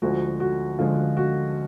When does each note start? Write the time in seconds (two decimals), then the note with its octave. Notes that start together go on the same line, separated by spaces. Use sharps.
0.02 D2 D3 F3 G#3 F#4
0.40 F#4
0.79 D2 D3 F3 G#3 F4
1.17 F#4